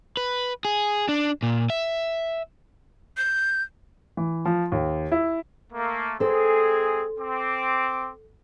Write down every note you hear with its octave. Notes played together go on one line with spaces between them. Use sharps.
B4
G#4
D4
A#2
E5
G6
E3
F3
D#2
E4
A3 A#3
G#3 C4 G#4 A4 C5
C4 D6